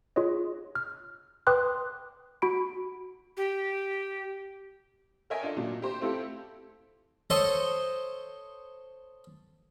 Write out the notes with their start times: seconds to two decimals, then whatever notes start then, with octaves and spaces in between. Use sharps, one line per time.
0.16 F4 G#4 C#5 D#5
0.75 F6
1.47 B4 G5 C6 D6 D#6 F#6
2.42 F#4 B5 D7
3.37 G4
5.30 A#4 C#5 D#5 E5 G5 G#5
5.43 D4 F4 A4 D#5
5.56 A#2 F#3 D4
5.82 G4 C5
6.01 A3 C4 E4 F4 G4 A4
7.30 A4 C5 C#5 D#5